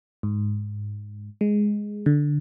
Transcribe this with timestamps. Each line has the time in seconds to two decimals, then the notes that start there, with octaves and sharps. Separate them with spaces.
0.23 G#2
1.41 G#3
2.06 D3